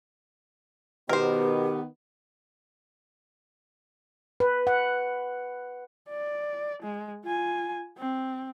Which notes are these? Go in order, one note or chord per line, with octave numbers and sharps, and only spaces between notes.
B2 D#3 B3 G4 A#4 C5
B4
F#5
D5
G#3
F4 G#5
C4